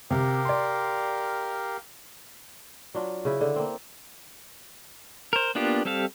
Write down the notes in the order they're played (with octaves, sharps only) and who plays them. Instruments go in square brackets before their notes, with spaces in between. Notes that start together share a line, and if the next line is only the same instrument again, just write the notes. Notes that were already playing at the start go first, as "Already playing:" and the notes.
[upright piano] C3 [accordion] G4 A#4 F5
[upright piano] D5 C6
[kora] F#3 D4 F4
C#3 E4
D3
A#3 C4
[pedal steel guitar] A#4 C5
A#3 B3 D4 F4 G4
G3 C4 G4 A4 F5